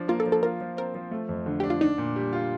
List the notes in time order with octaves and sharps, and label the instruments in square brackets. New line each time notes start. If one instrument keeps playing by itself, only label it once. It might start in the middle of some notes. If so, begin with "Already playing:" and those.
Already playing: [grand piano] F3 D4
[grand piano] A#3 [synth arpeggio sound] F4
[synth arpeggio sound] A4
[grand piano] F3
[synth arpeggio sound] A4
[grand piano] F4 [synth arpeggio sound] A#4
[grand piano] F3
[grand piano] C4 [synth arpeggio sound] A#4
[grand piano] F3
A3
F2
D3
[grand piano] D4 [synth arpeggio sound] G4
[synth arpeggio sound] F4
[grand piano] D4 [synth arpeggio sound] D#4
[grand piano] A#2
G3
F4